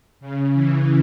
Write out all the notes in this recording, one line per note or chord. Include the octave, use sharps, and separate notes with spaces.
C#3
E3